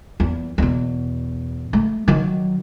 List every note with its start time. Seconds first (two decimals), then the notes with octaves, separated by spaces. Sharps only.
0.20 E2
0.58 E2 B2
1.73 A3
2.08 D#3 F#3